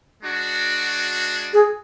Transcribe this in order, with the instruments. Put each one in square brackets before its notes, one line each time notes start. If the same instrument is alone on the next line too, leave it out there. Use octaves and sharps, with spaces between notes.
[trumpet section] G#3 D4 F#4
[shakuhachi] G#4